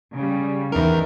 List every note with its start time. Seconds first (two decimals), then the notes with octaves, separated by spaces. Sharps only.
0.14 C#3 G3
0.72 E2 D#3 E3 A#4